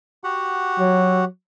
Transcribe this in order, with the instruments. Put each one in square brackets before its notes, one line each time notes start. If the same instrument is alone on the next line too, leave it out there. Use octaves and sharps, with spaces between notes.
[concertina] F#4 G4 F#5
[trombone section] F#3